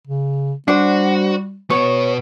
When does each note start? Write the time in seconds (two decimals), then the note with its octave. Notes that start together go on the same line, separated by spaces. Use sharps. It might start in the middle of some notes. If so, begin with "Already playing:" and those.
0.07 C#3
0.68 G3 D4 F#4 C5
1.70 B2 B3 C#5